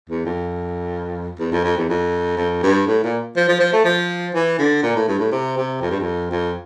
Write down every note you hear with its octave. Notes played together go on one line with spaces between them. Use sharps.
E2
F2
E2
F2
F2
E2
F2
F2
G2
A2
A#2
F3
F3
F3
A3
F3
E3
D3
A#2
A2
G2
A2
C3
C3
F2
G2
F2
F2